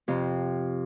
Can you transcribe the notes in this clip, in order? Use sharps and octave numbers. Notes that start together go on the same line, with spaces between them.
F2 C3